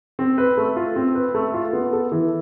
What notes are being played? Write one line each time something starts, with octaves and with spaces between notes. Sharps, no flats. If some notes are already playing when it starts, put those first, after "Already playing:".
C4
B4
A3
F4
C4
B4
A3
F4
B3
A4
E3